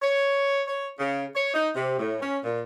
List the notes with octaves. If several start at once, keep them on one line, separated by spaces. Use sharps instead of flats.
C#5
C#5
C#3
C#5
D#4
C3
A2
C#4
A#2